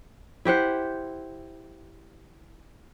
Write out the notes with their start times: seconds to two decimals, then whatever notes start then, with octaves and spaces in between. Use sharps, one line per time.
0.45 E4 G4 C5 F#5